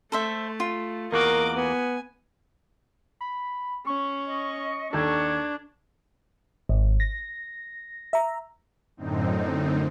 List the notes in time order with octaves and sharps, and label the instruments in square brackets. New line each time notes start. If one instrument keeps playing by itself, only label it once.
[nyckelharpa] A3 [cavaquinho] A4 C5 E5
[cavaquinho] F4
[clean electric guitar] E2 A#3 F#4 [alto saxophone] A#4 [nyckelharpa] D#5 D6
[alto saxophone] B3 [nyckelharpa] G#5
[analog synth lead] B5
[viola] C#4 [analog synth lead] C#6
[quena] D#5
[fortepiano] D#2 A4 [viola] D4 [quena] G#6
[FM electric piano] G#1
A#6
E5 A#5
[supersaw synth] F#2 A2 D3 C4 D#4